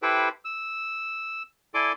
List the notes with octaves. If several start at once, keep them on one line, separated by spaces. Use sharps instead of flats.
E4 G4 A4 B4 C5 G5
E6
E4 A4 D5 G#5 C6 D6